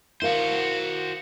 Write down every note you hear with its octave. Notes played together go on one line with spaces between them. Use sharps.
E4 F#4 A#4 C5 F5